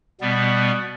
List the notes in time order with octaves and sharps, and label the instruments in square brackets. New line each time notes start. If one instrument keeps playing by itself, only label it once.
[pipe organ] B2 G3 B3